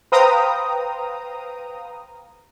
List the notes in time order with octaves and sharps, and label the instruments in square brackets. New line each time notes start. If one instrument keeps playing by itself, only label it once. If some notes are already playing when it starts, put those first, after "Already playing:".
[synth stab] B4 C5 F5 G5 A#5 D#6